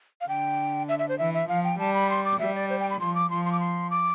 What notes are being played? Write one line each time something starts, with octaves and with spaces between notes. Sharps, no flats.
F5
D3 G5
E5
E5
C5
E3 E5
E5
F3 F5
G5
G3 A5
B5
C6
D6
G3 E5
D5
C5
G5
B5
F3 C6
D6
F3 C6
C6
D6
C6
D6